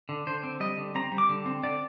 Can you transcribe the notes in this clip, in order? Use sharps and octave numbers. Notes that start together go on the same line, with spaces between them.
D3
D3 C5
C4
G3 D#5
D3
C4 A#5
G3
D6
D3
C4
D3 D5